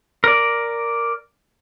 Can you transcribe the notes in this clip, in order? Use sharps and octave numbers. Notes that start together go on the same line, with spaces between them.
A#4 D5